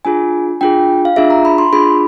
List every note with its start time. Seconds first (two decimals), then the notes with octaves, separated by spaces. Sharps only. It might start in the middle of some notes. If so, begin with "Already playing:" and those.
0.05 D4 F4 G#4 G#5
0.61 D4 F4 G#4 G5
1.05 F5
1.16 D4 F4 G#4 E5
1.30 A#5
1.45 B5
1.58 C6
1.73 D4 F4 G#4 B5